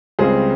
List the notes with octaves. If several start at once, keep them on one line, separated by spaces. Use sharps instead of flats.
C#2 C#3 G3 C4 G#4 C5